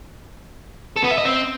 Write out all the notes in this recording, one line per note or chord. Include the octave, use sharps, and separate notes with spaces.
A4
B3
E5
D#5
C4